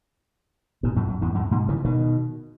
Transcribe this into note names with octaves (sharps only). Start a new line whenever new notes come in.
G#2 B2
F#2 A2
F#2
E2 G#2
F#2 A2
G#2 B2
C#3 E3
B2 D#3